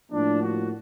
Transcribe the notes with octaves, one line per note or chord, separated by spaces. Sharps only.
A2 F3 A#3 D4
F#4